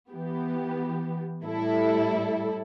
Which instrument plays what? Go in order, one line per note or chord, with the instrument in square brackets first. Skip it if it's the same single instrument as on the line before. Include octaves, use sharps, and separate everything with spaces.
[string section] E3 B3 G4
A2 G3 E4 A4